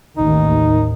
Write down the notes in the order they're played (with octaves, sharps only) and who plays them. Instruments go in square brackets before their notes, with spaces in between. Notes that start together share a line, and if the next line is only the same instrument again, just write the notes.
[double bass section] A1 D#2 D#3 [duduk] D#4